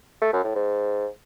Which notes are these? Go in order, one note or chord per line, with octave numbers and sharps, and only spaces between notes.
A3
F#2
A2
G#2